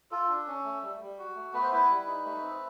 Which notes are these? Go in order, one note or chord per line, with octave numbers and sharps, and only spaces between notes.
F4 A4
D4
C#4
A3
G3
G3
F#4
A3
B3 B4
C5
E4 B4
G3
D#4
A3
C4